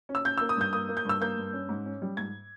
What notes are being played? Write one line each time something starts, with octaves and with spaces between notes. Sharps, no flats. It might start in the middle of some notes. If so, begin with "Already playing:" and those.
C#4
E6
C#4 G6
E6
A#3
D#6
G2 G6
A#3 D#6
A#3
G6
G2 E6
A#3 G6
G2
C#4
G#2
C#4
G3
G#2 G#6